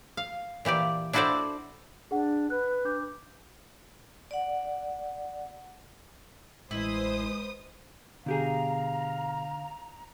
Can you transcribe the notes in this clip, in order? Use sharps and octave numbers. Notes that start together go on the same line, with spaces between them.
F5
A#2 E3 G4 D5
D4 E4 F#4 A4 C5 D5
D4 G#4 F#5
B4 F#6
D4 D6 G6
D5 F#5
A1 G#3 E4 B4 C5 D#6
B2 D3 G4 G#4 F5 A#5